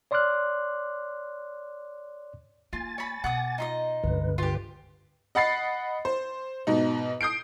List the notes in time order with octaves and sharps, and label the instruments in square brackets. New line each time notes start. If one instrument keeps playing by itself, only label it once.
[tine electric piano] C#5 D5 C6 D6 F6 F#6
[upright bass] A#3 [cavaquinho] F4 [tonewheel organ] G#5 A6
[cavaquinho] C#5 B5
[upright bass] B2 [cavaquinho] F#5 D6 D#6
[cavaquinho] D#4 F4 D#5
[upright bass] F1 C#2 [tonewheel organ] G2 D3 B4
[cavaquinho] F4 G4
[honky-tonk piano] D#5 F#5 B5 A6 C7
C5
G#2 B2 D#4
D#6 G6 C7 D7